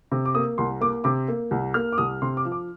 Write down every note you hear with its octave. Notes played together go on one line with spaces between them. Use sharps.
C3
D6
A#3 D#6
C2 C6
A#3 D6
C3 D6
A#3
C2
A#3 F6
D6
C2 D#6
C3 C6
D6
F3
D6